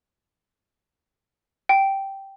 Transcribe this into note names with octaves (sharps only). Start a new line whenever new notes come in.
G5